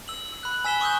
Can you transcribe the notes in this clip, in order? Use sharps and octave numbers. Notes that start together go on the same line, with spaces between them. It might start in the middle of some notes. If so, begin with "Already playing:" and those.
E6 F#7
B5 F#6
G#5 E6 B6 E7 G7
C#6 D#6 E6 F#6 G6